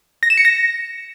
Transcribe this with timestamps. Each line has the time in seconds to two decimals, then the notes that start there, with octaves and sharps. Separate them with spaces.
0.23 A#6
0.30 E7
0.37 C#7
0.45 A#6